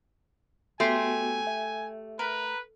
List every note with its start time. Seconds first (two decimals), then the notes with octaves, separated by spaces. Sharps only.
0.80 A3 B3 F#4 G4 G#5 C6
1.47 E5
2.19 A#4 B4